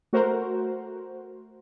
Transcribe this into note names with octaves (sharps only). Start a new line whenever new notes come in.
A3 F#4 A#4 C5